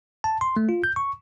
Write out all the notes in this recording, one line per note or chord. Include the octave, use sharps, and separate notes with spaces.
A5
C6
A3
F4
G6
C#6